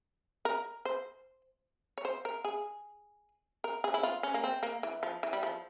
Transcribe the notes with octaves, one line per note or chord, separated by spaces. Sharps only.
A#4
C5
C#5
C5
A#4
G#4
A#4
G#4
E4
F4
C#4
A#3
C4
A#3
E3
F3
E3
G3
F3